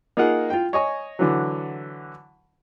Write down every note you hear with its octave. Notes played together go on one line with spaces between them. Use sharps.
A#3 D#4 F4 G#4 F#5
F4 G5
C#5 D#5 G#5 C#6
D3 E3 F#3